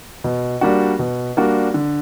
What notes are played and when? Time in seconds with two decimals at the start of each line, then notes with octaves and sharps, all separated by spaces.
0.24 B2
0.61 G3 A#3 D4 F#4
0.99 B2
1.37 G3 A#3 D4 F#4
1.74 D3